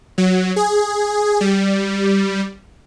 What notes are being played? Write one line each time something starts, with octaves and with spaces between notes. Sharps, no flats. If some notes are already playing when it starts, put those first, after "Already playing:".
F#3
G#4
G3